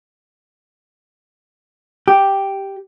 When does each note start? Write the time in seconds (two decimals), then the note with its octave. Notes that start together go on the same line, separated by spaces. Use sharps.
2.08 G4